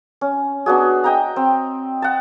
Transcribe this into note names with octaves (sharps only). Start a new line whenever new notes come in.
C#4
B3 D4 F#4 G#4
D#5 G5 A#5
C4
F#5 A5